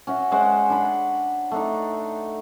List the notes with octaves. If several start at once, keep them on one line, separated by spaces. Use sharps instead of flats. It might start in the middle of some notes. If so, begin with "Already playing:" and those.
C#4 F#4 E5
G#3 C#4 C5 F#5
D4 B5
A3 D4 D#4